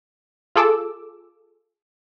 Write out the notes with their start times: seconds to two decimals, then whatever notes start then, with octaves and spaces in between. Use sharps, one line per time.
0.56 F4 G#4 A4 D6 E6